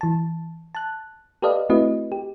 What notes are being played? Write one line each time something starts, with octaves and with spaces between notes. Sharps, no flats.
E3 A5
A5 F#6
G4 A4 B4 D5 D#5 F5
A3 C4 E4 F#4 B4 D#5
G4